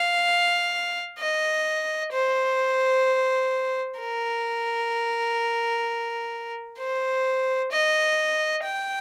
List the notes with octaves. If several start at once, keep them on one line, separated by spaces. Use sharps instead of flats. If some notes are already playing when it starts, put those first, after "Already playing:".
Already playing: F5
D#5
C5
A#4
C5
D#5
G5